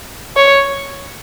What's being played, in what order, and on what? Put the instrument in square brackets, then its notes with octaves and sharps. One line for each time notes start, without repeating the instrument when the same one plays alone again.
[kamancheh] C#5